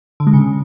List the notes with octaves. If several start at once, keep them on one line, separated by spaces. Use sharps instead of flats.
D3
G#3
C#3